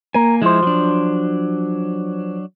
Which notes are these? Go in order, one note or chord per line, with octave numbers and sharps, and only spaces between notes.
A#3 A#4 G#5
F3 G#3 E4 C5
F#3 D4